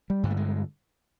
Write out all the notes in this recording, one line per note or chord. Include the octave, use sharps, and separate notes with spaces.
G3
G2 D3
A3
G#3